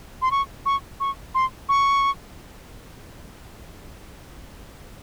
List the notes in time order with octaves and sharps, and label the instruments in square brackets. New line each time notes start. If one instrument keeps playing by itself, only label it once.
[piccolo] C6
C#6
C#6
C#6
C6
C#6